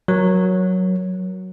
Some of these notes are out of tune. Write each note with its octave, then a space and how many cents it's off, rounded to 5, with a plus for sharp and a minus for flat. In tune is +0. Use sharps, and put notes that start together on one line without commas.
F#3 +0 A#4 +25